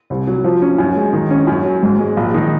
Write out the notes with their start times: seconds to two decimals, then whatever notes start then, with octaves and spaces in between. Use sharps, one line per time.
0.10 C2
0.27 F#3
0.44 F3
0.62 C#4
0.78 F#2
0.96 G#3
1.13 D#3
1.30 C#4
1.47 F#2
1.65 F#3
1.83 G#2
1.99 G#3
2.17 A#1
2.34 D#3